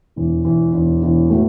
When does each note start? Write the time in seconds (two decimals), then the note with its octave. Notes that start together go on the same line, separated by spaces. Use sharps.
0.16 E1 E2 E3
0.45 E1 E2 E3
0.73 E1 E2 E3
1.02 E1 E2 E3
1.30 A2 A3 F#4 B4